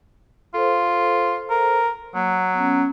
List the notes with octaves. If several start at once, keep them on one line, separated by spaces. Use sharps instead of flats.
F4 A4 C5
A#4
F#3 A#3
B3 C#4